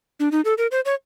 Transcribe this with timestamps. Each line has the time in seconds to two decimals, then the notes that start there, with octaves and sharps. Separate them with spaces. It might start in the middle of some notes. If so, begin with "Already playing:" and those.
0.20 D4
0.32 D#4
0.45 A4
0.58 A#4
0.71 C5
0.85 C#5